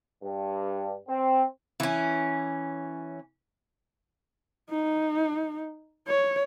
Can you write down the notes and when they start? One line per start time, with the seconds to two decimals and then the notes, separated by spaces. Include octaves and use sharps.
0.23 G2
1.09 C4
1.80 E3 C#4
4.71 D#4
6.08 C#5